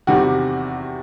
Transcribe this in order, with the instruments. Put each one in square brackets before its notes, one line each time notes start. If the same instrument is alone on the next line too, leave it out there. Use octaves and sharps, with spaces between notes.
[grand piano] E2 C3 D#3 G3 F#4